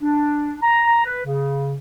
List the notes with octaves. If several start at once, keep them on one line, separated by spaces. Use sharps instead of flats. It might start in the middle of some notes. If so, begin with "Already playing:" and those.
D4
A#5
B4
C#3